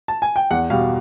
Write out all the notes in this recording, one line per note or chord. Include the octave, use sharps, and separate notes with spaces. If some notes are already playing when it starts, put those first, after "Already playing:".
A5
G#5
G5
E2 F#5
B2 G3 F5